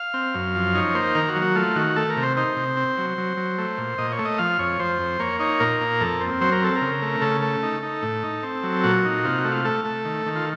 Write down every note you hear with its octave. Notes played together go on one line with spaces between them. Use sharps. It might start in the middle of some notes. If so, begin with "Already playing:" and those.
Already playing: F5
C4
F#2
F3
D#4 C#5
A#3 C5
D#3 A#4
F#4
F#3
F#4
A3 F4
D#3 F#4
A3 A4
A#4
C3
C5
D#4 C5
C3
C4
F#3
F#3
F#3
A3
A#2
A#2 D#5
C#5
A3
D#5
F3 F5
F2 C#5
F3 C5
F2
A#3 C#5
D#4 C#5
A#2 A#4
A#3
F2 A4
C4
F#3 C5
A#4
C4 A4
A#4
C#3
A3
C#3 A4
A3
D#4
D#4
A2
D#4
C4
F#3
A#2 F#4
D#4
C3 F4
F#4
A3
F4
A3 A4
A3
D#3
D#3
F4